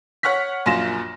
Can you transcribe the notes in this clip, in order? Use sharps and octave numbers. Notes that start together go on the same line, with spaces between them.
C#5 F#5 C#6 F6 B6
A#1 F#2 F4 C6 A#6 E7